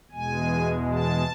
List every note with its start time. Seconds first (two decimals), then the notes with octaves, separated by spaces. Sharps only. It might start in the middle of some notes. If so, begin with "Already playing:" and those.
0.11 E2 B2 G#3 G#5
0.91 A5